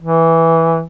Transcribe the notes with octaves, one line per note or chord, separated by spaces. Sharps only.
E3